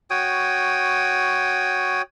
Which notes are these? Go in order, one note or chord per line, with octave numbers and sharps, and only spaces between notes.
F#4 C#5 G5 D#6